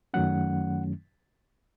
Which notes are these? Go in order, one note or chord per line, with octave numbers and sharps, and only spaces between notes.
F#2 D#3 F#3 A3 C#4 F#5